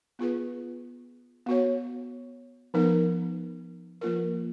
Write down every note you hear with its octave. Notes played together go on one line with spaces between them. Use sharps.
B3 F4 G#4 B4
B3 F#4 C#5
F3 B3 D#4 A#4
F3 A#3 F4 A#4